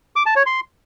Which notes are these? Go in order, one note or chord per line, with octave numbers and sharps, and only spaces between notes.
D6
A5
C#5
C6